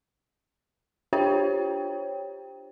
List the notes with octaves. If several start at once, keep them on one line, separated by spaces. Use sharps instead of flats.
D4 F4 G4 C5 C#5 G5